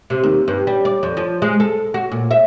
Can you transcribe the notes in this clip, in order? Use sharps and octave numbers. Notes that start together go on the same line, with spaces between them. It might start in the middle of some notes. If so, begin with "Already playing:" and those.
C3
D#2
G2
G3
D5
F2
F3
G#3
A4
F#4
A#2
E5